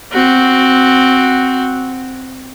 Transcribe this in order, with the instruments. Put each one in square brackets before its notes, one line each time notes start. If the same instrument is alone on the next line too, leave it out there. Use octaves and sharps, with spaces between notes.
[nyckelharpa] C4 F#4